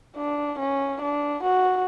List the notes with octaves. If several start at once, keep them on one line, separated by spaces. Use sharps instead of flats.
D4
C#4
D4
F#4